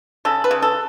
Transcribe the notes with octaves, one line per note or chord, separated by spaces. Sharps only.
C#3 A4
B4
C#3
A4